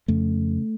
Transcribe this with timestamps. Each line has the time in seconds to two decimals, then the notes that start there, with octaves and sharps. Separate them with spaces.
0.08 F2 C#3 A3